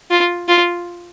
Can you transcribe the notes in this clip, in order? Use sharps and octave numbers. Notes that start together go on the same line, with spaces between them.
F4
F4